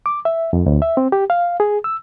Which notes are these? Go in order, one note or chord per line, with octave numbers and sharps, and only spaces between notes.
D6
E5
F2
D2
E5
C4
G4
F5
G#4
E6